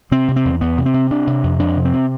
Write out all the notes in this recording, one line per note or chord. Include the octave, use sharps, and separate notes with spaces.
C3 C4
C3
C4
E2
E2 B3
C3
C4
C3
C3 D4
C3
F2
F2 D4
C3
C4
C3